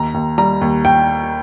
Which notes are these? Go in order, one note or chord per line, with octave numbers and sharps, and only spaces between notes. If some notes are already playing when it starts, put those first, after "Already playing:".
Already playing: D#2 A#5
D#2
G3 A#5
D#2
G5